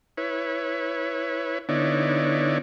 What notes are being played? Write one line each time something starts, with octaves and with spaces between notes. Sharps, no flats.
E4 B4 C#5
D3 B3 D#4 E4 C#5 D5